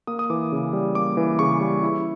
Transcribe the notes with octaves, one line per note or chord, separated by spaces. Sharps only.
A#3 D#6
D#6
E3 D6
C#3
G3
A#3 D6
E3
C#3 C#6
G3
E4